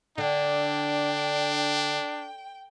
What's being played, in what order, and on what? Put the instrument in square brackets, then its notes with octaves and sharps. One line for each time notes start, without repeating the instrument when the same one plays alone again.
[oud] D3 [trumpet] D4 [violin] G5